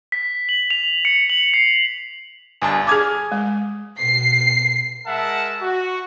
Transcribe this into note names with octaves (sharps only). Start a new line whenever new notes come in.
B6
F#7
F7
C#7
F#7
C7
G1 G2 G#5 A5
G#4 G#5 D6 D#6 G#6
G#3
B2 C7
G#3 A#4 E5 F#5 A5
F#4